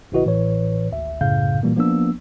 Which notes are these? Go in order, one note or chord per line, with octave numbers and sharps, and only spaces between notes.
A#1 D3 E4 F#4 B4 D#5
A1 A2 E3 B4 C#5
G#1 D2 E5
C2 F#2 A2 C#3 F5 G6
A#2 E3 G3 A#3
F3 A#3 B3 D4 E6